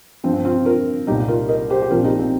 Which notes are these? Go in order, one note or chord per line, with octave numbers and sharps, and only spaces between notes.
G2 F3 C4
C4
C4 F4
F4 A#4
C2 A#2 G3 D#4 G4
F4 A#4
A#4 D#5
G4 C5
G4
A#1 A#2 F3 C4 F4 A#4
D#4 G4
C4